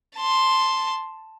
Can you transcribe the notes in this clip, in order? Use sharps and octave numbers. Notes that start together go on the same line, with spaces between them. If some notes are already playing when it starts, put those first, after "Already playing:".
A5 C6